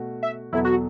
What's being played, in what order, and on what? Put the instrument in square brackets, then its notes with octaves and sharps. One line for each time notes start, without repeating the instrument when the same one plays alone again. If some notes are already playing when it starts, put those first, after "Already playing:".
Already playing: [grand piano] B2 A3 F#4
[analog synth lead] E5
[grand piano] E2 B2 F#3 B3 A4 [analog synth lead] E4
[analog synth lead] F#4